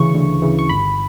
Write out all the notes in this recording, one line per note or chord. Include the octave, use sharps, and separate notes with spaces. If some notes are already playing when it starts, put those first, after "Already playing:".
Already playing: D2 C#3 E3 C#6
D2
C#3 E3
C#6
G1 B5